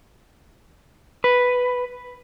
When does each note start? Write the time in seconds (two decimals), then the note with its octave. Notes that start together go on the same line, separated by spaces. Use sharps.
1.24 B4